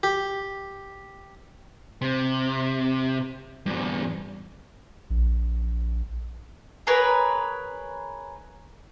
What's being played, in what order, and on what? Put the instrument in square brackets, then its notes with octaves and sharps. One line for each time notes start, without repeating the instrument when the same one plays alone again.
[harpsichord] G4
[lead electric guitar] C3
E2 G2
[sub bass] A#1
[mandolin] G#4 A#4 B4 C#5